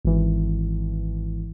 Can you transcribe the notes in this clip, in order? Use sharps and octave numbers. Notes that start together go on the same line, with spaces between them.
G#1 E3